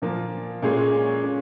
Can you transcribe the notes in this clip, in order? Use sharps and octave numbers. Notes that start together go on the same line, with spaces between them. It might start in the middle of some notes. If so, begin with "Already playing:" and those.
A#2 F3 A#3 F4
A#2 G#3 C#4 G#4 C#5
G#3 C#4